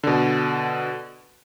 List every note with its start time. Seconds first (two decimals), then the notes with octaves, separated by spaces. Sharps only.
0.03 B2 D3